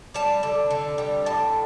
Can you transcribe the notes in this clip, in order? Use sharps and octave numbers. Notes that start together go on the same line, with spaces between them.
G3 A5
D3
D3
G3
A2 A5